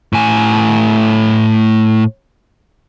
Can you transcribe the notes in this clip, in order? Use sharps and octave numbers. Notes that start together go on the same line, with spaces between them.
A2 G#5